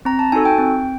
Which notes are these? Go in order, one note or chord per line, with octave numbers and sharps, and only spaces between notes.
C4 A#5
A5
D#4 F#4 A4 G#5
G5
C4